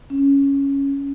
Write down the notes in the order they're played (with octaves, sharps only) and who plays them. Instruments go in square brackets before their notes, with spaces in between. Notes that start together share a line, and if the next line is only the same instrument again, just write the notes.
[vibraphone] C#4